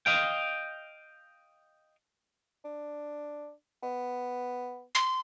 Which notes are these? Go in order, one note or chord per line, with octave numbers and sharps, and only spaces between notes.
D#5 F5 G5
D4
B3
C6